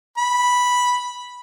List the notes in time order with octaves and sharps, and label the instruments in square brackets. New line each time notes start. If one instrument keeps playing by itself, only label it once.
[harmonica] B5